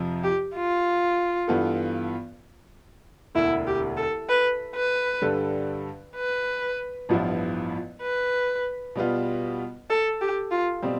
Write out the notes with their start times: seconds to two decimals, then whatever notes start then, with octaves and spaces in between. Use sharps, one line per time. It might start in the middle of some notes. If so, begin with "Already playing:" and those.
Already playing: F2 C3 F3
0.23 G4
0.55 F4
1.48 G2 E3 B3 F4 A4
3.35 E1 D2 D3 E4
3.67 G4
3.97 A4
4.29 B4
4.75 B4
5.22 G2 D3 G3 D4 A4
6.16 B4
7.09 A1 G2 F3 B3 E4
8.02 B4
8.95 B2 G3 B3 F4
9.90 A4
10.21 G4
10.51 F4
10.83 B2 G3 C4